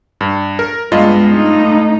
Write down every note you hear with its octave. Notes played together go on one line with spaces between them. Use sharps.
G2
A#4
G2 G#3 B3 F4 D#5
A3 D#4